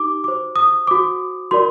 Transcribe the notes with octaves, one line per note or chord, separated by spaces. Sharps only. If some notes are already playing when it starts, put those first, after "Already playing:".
Already playing: D#4 G4 D6
F#4 C5 D6
D#6
F#4 C5 D6
F#4 A#4 D5 C6